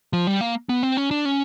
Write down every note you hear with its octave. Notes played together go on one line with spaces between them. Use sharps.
F3
G3
A#3
B3
C4
C#4
D4
C#4